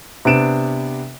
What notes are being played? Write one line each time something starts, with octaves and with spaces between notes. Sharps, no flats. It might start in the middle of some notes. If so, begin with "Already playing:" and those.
C3 B3 D4 D7 E7